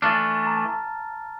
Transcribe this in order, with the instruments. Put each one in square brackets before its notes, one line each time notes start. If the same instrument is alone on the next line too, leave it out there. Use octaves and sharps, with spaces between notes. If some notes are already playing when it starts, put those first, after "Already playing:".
[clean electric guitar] E3 A3 D4 [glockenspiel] F6 A6
[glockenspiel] A#5
A5
A#5